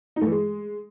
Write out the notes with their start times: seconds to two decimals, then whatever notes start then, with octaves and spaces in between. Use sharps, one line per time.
0.16 D#4
0.21 A3
0.27 E3
0.32 G#3